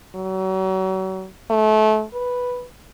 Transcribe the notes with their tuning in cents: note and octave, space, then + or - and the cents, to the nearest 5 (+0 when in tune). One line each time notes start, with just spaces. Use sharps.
F#3 +35
A3 -30
B4 +0